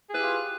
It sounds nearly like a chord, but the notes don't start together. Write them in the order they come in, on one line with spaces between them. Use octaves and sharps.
G#4 B4 E4 G4 F4